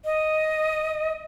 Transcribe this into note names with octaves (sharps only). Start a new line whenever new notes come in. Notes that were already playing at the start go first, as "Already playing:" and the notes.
D#5